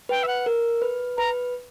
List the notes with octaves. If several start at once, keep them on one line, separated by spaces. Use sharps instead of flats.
B4 G5
E5
F#5
A#4
B4
B4 A#5